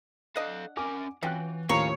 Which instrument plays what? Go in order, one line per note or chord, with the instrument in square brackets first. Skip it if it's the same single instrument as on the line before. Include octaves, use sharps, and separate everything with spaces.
[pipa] D4 D#5 F#5 [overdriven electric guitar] A4 F5
[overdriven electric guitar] C#4 A#4 [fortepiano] G#5 D6
[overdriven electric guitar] E3 [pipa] C#4 F4 F#4 [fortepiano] G5 F#6
[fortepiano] D#2 A2 F3 [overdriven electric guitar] C#4 F5 [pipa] A#4 [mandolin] C#5